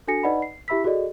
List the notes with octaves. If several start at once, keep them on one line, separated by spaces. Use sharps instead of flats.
D4 F#4 A4 G#5 A#6 C#7
D#4 B4 D5 D#5 F#5 B5
C7
E4 G4 E5 B5 E6 B6
F#4 G#4 A4 D5 D#5